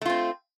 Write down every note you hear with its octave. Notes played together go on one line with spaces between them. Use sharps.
A3 C4 F4